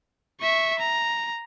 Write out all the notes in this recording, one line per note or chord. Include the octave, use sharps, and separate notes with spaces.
E5 C#6
A#5